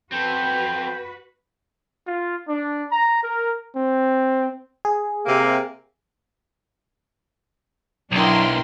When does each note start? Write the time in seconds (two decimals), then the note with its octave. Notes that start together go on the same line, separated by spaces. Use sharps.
0.12 C4 F#4 A4 B4 G6
2.07 F4
2.48 D4
2.91 A#5
3.23 A#4
3.76 C4
4.85 G#4
5.26 C3 A#3
8.12 B1 F#3 D4 E4 A#4 G5 C6